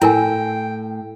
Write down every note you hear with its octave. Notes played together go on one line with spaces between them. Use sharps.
A2 E4 A#4 G5 G#5